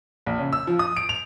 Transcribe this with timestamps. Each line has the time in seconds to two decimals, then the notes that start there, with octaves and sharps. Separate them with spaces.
0.26 A#1
0.39 C#3
0.53 E6
0.67 F3
0.79 D#6
0.97 D7
1.09 F7